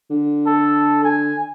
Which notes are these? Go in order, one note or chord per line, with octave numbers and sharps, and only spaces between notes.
D3
A4
G#5